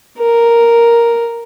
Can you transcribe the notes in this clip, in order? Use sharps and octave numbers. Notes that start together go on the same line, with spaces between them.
A#4